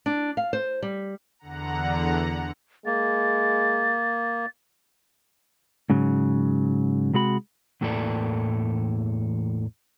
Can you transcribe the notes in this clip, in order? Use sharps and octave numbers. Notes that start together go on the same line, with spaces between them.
D4
F5
C5
G3
E2 D3 F#5 A#5
G#3 A#3 A6
G#2 C#3 F#3
C3 G#3 F#4 B5
E2 A2 E3 A#3 A4 D5